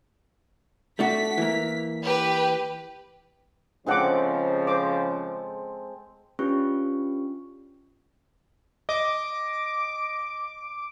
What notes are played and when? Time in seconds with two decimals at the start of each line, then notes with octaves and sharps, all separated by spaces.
0.99 A3 D4 F#4 B6
1.38 E3 A#3
2.02 G4 B4
3.86 C#3 F3 G#3 C4 D4 A4 F#5 D6
4.67 C5 D6
6.39 C#4 D4 F4 G4 B4 C#6
8.89 D#5 D6